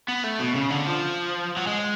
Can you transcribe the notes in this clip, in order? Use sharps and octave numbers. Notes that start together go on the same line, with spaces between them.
B3
A3
B2
C#3
D3
F3
F#3
G#3